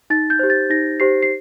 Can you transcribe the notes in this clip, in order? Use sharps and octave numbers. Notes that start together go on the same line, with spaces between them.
D#4 A6
G6
G4 C5
A6
D#4 A#6
G4 C5 C7
C7